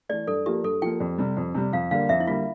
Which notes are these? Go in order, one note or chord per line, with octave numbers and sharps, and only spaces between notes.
E3 A3 D5
G2 A4
F3 A#3 G4
G2 A4
F3 A#3 G5
F2
C3 G3
F2
C3 G3
F2 F5
D3 G3 A#3 F5
F2 E5
E4
D3 G3 A#3 F4